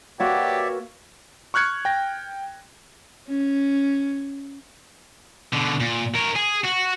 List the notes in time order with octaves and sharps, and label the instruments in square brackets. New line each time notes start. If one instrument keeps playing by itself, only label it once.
[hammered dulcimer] A#3 F#4 B4 [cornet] G4 [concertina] C#5 D5 E5
[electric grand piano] C#6 F6 F#6 G#6 C#7
G5 A#6
[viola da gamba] C#4
[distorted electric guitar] B2 D3
A#2
A#4 C#5
G#4
F#4